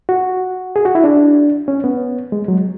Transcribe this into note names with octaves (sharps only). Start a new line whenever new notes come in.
F#4
G#4
F#4
E4
D4
C#4
B3
G#3
F#3